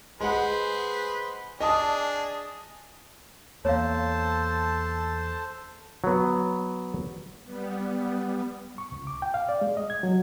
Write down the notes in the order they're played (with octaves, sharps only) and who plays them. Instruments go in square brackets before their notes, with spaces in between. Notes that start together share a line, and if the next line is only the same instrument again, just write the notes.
[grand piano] G#3 F#5 [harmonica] G#4 B4 C5
[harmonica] D4 G#4 [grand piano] D#5 A5 D#6
[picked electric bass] E2 A#3 [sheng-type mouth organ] A4 C5 A5 [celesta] C#5 F5
[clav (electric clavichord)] F#3 B3
[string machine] G3 B3
[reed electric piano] C#6
C#2
D6
G5
F5
D5
G#3
D#5
G#6
F#3